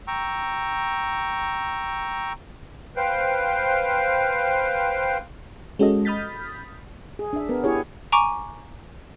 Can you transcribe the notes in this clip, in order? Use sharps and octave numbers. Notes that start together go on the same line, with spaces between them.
G5 A#5 C#6 E6
B4 C5 F5 G5
G#3 C#4 F#4 A4 D#5
B5 D#6 F6 G6 A6 B6
G#4
D4 E5
B3 A#4
E4 G4 G#4 C#5
G#5 A#5 C#6 D6 D7 D#7